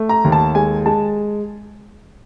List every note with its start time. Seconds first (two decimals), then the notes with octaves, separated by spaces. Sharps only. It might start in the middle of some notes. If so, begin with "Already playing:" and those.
Already playing: A3
0.09 A#5
0.24 D#2
0.32 A5
0.55 G#3 G#5
0.86 G#3 A5